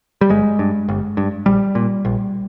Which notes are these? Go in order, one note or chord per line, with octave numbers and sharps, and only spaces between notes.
G3
G1 G#3
G2
G1
G2
A#1 G3
A#2
A#1